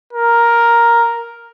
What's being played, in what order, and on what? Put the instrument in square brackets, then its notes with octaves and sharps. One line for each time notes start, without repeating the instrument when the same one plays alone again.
[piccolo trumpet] A#4